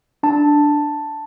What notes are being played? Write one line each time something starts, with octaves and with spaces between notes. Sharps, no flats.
D4 A5